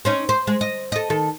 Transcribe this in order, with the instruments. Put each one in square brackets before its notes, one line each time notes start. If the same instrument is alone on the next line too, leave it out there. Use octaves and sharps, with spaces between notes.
[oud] C4 C#4 D#4
C5
G#3
D#5
A4 D#5
D#3 A4